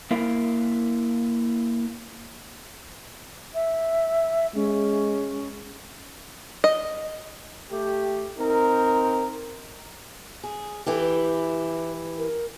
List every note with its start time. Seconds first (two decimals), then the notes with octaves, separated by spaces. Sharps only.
0.11 A#3 E4 A#4 F5
3.54 E5
4.55 G#3 C#4
6.64 D#5
7.71 A3 G4
8.38 C4 D#4 A#4
10.43 G#4
10.86 E3 E4 G4 A4
11.00 B4
12.18 A#4